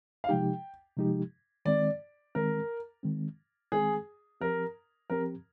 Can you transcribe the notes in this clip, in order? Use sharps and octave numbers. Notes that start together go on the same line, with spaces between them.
F5
C3 F3 G#3 D#4 G4 G5
C3 F3 G#3 D#4 G4
D#3 G#3 C4 D5
D#3 G#3 C4 A#4
D#3 G#3 C4
D#3 G#3 C4 G#4
F3 C4 G4 A#4
F3 C4 G4 A#4